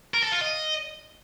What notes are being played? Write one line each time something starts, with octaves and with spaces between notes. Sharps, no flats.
A#4
A4
F4
D#5